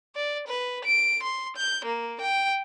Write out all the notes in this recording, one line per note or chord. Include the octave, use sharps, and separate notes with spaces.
D5
B4
D7
C6
G6
A#3
G5